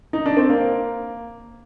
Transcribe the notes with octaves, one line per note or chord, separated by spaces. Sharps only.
D#4
D4
C4
A#3